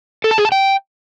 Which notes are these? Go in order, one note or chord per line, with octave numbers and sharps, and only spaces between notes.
A4
A5
G#4
A5
G5